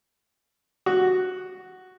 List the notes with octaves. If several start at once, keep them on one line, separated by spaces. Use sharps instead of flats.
F#4